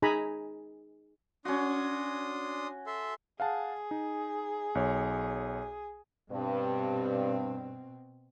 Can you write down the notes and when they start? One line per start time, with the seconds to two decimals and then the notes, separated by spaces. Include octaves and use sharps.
0.02 D#4 G#4 G#5 A#5 B5
1.45 C#4 D4 F#4 C6 D#6
2.87 A4 E5 C6
3.40 G#4 F5 F#5 A5
3.91 D#4
4.75 B1 C#5
6.31 G2 B2 C4